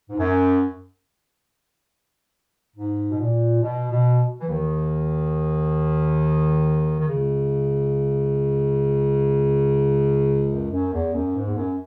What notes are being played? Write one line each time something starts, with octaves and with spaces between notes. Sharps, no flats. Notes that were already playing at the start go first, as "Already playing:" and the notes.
G#2
F#2
G#2
B2
A#2
B2
B2
E3
D#2 D#3
D#3
C#2 C#3
F#2
F#2
E2
F#2
G#2
E2
F#2